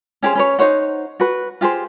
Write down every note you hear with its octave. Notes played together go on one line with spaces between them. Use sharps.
C#4 G4 G#4 C5
C#4 B4 C#5
D#4 C5 C#5 F#5
F#4 B4
F4 G4 G#4 C5